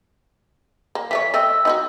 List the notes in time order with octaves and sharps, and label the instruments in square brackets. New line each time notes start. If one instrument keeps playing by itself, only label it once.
[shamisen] A#3
[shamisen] E3 A3 C#5 [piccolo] B6
[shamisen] A3 C4 D#5 [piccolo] E6
[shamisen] D#4 E4 F#4